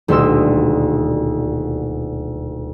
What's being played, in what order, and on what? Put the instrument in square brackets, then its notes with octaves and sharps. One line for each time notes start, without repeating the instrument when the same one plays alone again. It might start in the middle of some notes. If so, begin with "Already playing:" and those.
[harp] D#1 D2 B2 C6 E6